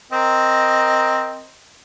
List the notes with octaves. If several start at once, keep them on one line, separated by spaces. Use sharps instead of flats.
C4 A#4 D#5